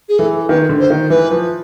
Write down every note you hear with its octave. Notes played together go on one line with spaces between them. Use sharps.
G#4
E3 A4
D#3 B4
D3
C5
D#3
E3 B4
F3